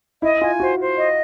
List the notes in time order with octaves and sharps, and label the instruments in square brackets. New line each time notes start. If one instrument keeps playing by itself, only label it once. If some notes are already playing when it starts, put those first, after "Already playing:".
[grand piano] E4 [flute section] D#5
[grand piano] F4 [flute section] G#5
[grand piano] F#4 [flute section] C5
[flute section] C5
D#5